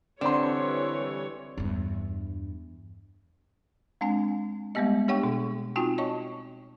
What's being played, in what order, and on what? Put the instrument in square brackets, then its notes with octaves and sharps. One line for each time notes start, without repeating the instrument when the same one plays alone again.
[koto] D3 [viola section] E3 G3 C#5 [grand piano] C4 C6
[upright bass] E2 G2
[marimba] G#3 C4 D4 G#5
G3 G#3 A#3 B3 G4 D#5
D4 G4 C#5 F#5 G5 C#6
B2
C4 D#4 F4 F#4 G5 G#5
C#5 D#5 A5 C#6